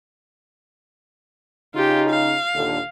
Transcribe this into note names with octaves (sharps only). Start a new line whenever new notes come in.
C#3 D#4 F4 G4
F5
D#2 A#2 D3